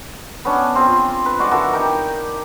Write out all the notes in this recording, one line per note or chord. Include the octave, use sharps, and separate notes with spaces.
B3 C#4 D4
C4 F4 G#4
B4
G#3 F#4 D5 F5
E3 F#4 A4 A#4
D#4 G4 A#4